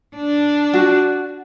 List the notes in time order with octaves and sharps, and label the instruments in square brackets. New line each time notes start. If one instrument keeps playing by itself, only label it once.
[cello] D4
[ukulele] F#4